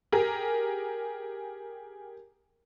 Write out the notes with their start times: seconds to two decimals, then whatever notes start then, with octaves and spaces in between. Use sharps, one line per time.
0.12 G4 G#4 A#4